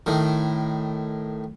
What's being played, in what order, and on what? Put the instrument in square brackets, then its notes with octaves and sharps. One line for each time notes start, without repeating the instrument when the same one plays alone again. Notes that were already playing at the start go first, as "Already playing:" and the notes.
[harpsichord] A2 D#3